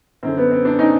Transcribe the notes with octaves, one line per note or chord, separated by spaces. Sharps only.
F#2 D3 C4
B3
C4
C4 D4
C#4 D#4